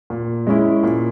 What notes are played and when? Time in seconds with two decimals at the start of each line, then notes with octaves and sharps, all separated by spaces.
0.10 A#2
0.47 G#3 C#4 E4
0.83 A#2